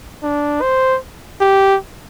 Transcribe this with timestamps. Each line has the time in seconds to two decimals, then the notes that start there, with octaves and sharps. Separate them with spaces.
0.23 D4
0.62 C5
1.41 G4